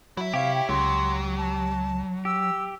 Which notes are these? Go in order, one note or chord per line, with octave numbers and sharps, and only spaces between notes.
F#3 E4 E5
C3 G4 C#5 F5
G5
C#2 F#3 C6
A5
G4 E6